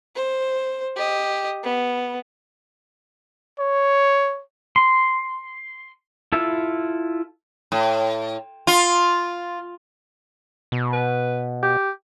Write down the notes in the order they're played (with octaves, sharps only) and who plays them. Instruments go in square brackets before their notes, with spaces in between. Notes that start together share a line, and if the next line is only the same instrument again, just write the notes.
[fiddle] C5
G4 D#5
B3
[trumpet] C#5
[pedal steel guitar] C6
E4 F4 A4 E5
[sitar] A2
F4
[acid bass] B2
[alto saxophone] B4
G4